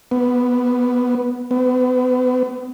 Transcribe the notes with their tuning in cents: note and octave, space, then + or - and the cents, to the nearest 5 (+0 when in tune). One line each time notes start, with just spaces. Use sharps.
B3 +0
B3 +35